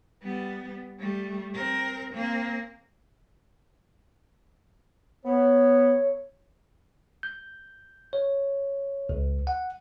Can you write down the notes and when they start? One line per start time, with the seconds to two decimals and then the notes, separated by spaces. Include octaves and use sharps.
0.23 G3 B3
1.00 G3 A3
1.54 C4 A#4
2.14 A#3 C4
5.26 B3 C#5
7.23 G6
8.13 C#5
9.09 C#2
9.47 F#5